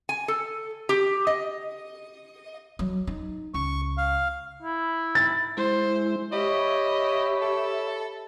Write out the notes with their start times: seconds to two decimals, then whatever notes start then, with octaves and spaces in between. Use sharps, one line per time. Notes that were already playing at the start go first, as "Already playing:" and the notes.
0.09 G#5
0.28 A4
0.89 G4
1.27 D#5
2.79 F#3
3.07 D#4
3.54 C#2 C#6
3.98 F5
4.62 E4
5.15 A6
5.57 G#3 E4 C5
6.32 G4 C#5 D#5 E5 B5
7.41 A4